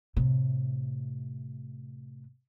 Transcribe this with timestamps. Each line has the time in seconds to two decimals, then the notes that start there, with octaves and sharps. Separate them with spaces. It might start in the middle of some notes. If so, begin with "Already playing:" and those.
0.17 A2 C3